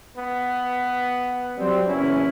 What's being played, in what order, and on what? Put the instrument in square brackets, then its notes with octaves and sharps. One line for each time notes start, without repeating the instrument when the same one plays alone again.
[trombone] B3
[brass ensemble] F#3 G3 C4
[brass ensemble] F#1 E2 C#4 [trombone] E4